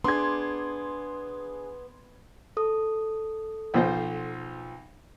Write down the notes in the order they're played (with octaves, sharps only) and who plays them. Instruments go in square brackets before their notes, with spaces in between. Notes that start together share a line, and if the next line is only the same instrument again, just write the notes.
[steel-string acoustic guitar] B3 [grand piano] D4 G#4 [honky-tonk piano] C6 D6 G#6
[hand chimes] A4 D#6
[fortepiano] B1 F3 C5